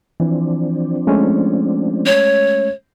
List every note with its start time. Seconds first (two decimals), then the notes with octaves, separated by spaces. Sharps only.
0.20 E3 F3 C4 D4
1.07 G#3 A3 C#4
2.06 C#5